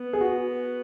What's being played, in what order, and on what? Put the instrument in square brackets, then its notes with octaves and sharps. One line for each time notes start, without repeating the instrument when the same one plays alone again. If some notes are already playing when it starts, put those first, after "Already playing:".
Already playing: [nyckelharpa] B3
[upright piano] G#4
F#4